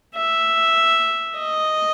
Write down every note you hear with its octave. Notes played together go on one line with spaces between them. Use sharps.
E5
D#5